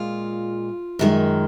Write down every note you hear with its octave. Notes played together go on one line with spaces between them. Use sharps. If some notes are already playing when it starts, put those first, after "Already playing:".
Already playing: A#2 G#3 F4
F#2 D#3 G#3